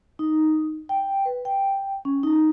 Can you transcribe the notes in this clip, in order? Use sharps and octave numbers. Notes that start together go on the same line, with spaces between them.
D#4
G5
B4
G5
C#4
D#4